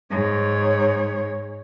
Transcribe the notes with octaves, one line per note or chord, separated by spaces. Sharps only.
G#2 C#5